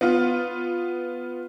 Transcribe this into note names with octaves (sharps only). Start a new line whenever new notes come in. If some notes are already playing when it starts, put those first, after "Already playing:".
B3 F4